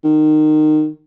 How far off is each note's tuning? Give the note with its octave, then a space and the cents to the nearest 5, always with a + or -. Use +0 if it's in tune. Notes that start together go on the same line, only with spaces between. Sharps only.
D#3 -20